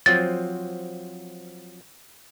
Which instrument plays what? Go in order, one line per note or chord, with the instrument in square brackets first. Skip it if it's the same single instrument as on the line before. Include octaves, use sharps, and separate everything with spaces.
[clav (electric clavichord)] F3 F#3 C4 [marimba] A6